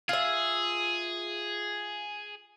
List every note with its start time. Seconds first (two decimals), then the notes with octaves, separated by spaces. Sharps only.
0.09 F4 G#4 E5